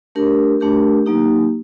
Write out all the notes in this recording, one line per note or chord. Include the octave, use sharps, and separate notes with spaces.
A3 D4 G4 A#4
A3 D4 G4 A#4
F#3 A#3 D#4 G4